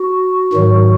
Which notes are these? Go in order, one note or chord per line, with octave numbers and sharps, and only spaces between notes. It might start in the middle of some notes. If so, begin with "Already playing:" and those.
Already playing: F#4
G#2 D#3 F#3